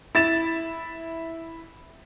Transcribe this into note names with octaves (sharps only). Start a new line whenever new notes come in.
E4 A6 E7